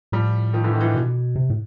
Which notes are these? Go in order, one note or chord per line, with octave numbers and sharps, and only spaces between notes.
A2 F3 G3
D#3 F3
D3 E3
D#3
E3
D#3
B2
C3
A2